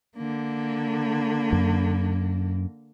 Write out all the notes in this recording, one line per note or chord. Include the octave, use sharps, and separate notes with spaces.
D3 A#3
F#2